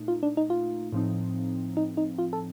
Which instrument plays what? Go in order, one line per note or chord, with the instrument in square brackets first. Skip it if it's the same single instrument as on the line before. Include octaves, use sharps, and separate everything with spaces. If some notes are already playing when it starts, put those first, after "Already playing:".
Already playing: [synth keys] A#2 A3 D#4
[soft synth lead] F4
D4
D#4
F4
[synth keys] A2 F3 C4 D#4
[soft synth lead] D#4
D#4
F4
A4